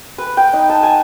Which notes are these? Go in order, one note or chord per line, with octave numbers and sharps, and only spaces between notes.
B4
G5
D#4
A5
G#5